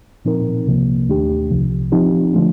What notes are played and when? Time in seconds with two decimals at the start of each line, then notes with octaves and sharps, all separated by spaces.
0.25 A#2 F3 C4 D#4 A#4
0.67 C2 C3 F3 A#3
1.08 D#2 D#3 A3 D4 G4
1.50 C2 C3 F3
1.92 F3 C4 D#4 G4
2.34 D3 F3 A3 D4